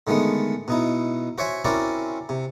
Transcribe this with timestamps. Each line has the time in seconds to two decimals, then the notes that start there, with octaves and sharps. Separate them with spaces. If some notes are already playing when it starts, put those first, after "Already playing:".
0.07 D3 D#3 G#3 A3 B3
0.68 B2 D#4 E4
1.38 F#4 C5 C#5 E5 G#5
1.65 C4 C#4 E4 F#4 A#4 D5
2.29 C3